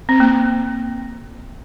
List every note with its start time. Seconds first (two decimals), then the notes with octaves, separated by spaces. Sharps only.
0.09 C4
0.20 A#3